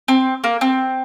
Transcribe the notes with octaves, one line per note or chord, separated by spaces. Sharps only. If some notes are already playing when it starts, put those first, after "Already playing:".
C4
A#3
C4